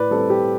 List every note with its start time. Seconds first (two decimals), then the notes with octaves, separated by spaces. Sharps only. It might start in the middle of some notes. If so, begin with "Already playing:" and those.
Already playing: A2 B4 D5
0.11 G3 C4 A4
0.30 G4